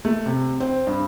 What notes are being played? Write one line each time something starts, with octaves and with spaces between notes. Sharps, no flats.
A3
C3
C4
G2